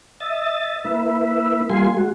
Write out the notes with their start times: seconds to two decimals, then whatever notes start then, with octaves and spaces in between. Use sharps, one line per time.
0.20 D#5 E5 A6
0.85 A#3 E4 B4 E5
1.70 G3 A#3 F4 G#5 C6
1.97 G#3 F#4